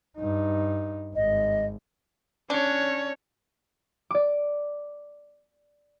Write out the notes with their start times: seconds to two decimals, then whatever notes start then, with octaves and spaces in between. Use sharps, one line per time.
0.18 G2 D#4
1.15 G#1 D#5
2.50 C#4 D4 C#5
4.11 D5 D6